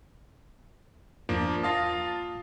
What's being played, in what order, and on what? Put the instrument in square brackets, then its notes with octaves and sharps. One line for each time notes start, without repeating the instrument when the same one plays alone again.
[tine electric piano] E2 G2 [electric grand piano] F3 A#3 D4
[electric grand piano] F4 F5 A5 [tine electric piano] D#6 A#6